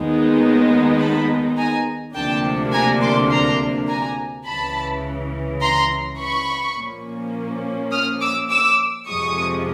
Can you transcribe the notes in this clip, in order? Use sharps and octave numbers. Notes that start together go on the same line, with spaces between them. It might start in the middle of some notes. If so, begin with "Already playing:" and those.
Already playing: D#2 D#3 G#3 B3 D#4
A5 B5
G#5 A#5
D2 C3 F3 A#3 D4 G5 A5
G#5 A#5
C6 D6
A#5 C6
G#5 A#5
C#2 C#3 E3 A5 B5
A#5 C6
B5 C#6
A#2 F3 A#3 C#4
D#6 F6
D6 E6
D6 E6
F2 C3 F3 G#3 C#6 D#6